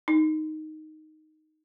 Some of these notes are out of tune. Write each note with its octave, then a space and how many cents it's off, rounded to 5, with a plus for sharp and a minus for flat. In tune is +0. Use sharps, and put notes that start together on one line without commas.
D#4 +0